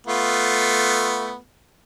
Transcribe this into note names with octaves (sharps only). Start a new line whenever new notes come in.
A3 B3 F4